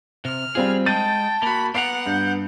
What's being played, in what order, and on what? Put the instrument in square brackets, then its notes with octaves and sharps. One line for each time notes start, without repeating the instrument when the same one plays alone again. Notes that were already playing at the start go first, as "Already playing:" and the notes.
[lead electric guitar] C3 [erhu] F6
[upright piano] G3 C4 F4 [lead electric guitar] G#4
[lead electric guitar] G#3 [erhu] G5 [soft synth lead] A5 [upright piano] G6 A6 D#7
[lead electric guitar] A#3 F#4 [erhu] B5
[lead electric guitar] B3 A#5 [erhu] F#5 [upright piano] C7 D7
[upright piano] G2 [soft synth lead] G6